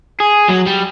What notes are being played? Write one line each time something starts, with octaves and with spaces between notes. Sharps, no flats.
G#4
F#3
G3